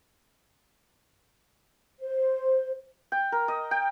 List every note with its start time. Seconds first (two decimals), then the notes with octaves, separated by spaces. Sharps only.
2.00 C5
3.12 G5
3.32 A#4
3.48 D#5
3.71 G5